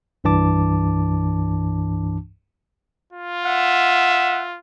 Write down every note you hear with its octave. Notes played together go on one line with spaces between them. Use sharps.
C2 G2 E3 D4 A5 D6
F4
E5 F#5